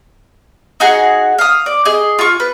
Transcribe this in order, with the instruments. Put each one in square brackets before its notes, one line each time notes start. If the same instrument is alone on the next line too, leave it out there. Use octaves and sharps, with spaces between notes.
[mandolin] D#4 F#4 G#4 F#5
F5 D#6
D5
G#4 D#5
F4 C#6
B4